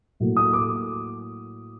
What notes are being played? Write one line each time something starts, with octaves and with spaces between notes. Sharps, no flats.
A2 F#3 A#3
D#6
D6